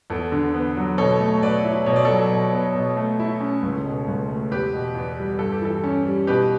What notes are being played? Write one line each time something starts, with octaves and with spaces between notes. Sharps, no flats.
E2 A4
D3
B3
F#3
B2 A4 C#5
A3
B2 B4 D5
E4
B2 C#5
D5
F#3 A4 C#5
B2
B3
B2
A3
E4
C#4
C#2
B2
C#2
A3
E2 G4 B4
B2
E2
G3
G2 A4
G4
E3 A4
C#4
G3
B2 G4 B4